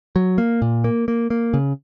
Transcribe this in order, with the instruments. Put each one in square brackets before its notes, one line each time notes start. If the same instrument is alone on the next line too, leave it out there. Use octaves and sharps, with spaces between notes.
[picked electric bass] F#3
A#3
A#2
A#3
A#3
A#3
C#3